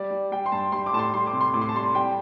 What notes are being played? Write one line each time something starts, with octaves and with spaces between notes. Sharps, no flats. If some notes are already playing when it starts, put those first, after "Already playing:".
Already playing: G3 D5
G3
G3 G5
C6
G2 A5
G3 C6
D6
A2 A5
C6
G3 C6
D6
C3
C6
A2 D6
C6
A5
G3 C6
G3 G5